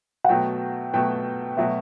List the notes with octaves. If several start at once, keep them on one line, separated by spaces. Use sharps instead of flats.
F#5
B2 F#3 A3 G5
B2 F#3 A3 G5
B2 F#3 A3 E5